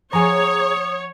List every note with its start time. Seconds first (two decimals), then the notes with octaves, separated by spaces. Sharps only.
0.13 F3 G#4 C#5 F#5 G#5 A#5 D#6